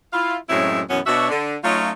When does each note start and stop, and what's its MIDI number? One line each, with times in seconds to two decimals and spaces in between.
0.13 0.36 64
0.13 0.36 65
0.13 0.36 77
0.49 0.81 42
0.49 0.81 45
0.49 0.81 54
0.49 0.81 56
0.49 0.81 60
0.49 0.81 64
0.90 1.00 42
0.90 1.00 47
0.90 1.00 52
0.90 1.00 54
0.90 1.00 59
0.90 1.00 61
1.06 1.29 47
1.06 1.29 62
1.06 1.29 66
1.06 1.29 73
1.06 1.29 76
1.30 1.56 50
1.64 1.90 54
1.64 1.90 57
1.64 1.90 61
1.64 1.90 63
1.64 1.90 65